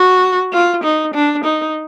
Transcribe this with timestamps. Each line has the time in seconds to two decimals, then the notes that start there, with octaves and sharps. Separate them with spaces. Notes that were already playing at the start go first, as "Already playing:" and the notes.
Already playing: F#4
0.53 F4
0.84 D#4
1.14 D4
1.45 D#4